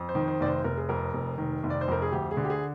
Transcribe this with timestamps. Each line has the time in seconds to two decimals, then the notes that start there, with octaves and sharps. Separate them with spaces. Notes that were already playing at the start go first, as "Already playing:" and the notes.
Already playing: F2
0.09 C5
0.15 D#3
0.28 C5
0.40 F1 D5
0.46 C5
0.64 F1 A#4
0.77 G#4
0.89 F2 A#4
1.14 F1
1.38 D#3
1.63 F1
1.70 D5
1.81 C5
1.88 F2 A#4
2.02 G#4
2.12 D2 G4
2.31 G#4
2.37 D3
2.45 G4
2.50 G#4